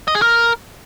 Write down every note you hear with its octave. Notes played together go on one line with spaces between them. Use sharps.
D#5
G#4
A#4